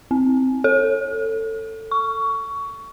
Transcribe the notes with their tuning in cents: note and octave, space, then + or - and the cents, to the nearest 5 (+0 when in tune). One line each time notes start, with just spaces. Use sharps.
C4 -5
A4 +20
C#6 +20